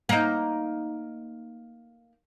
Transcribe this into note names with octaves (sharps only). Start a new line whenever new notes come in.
A#3 D#4